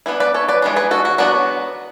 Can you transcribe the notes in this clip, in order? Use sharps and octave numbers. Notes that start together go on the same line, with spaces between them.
E3 B3 D4 E4
B4 D5
A4 C#5
B4 D5
E3 G#3 B3 D4
G#4 B4
F#4 A4
F#4
F#3 B3 D4 F#4